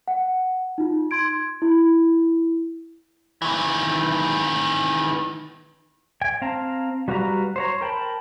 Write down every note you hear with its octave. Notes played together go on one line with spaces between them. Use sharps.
F#5
D#4 F4
C6 G#6 D7
E4
D#3 E3
G5 G#5
C4 F5 A5 A#5
G3 F#4 B4 F5 A#5
C5 C#5 A#5
A#4 G5 A5 B5